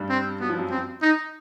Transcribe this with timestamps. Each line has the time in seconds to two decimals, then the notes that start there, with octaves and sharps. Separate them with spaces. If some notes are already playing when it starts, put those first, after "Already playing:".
Already playing: G2 G3
0.09 C4
0.40 F#3 B3
0.50 F3
0.58 F#2 F#3
0.70 C4
1.02 D#4